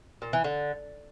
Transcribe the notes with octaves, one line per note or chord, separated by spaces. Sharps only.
A#2
E3
D3